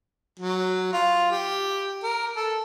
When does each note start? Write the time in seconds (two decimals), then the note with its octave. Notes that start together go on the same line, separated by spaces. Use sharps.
0.40 F#3
0.93 F4
1.31 G4
2.03 A#4
2.36 A4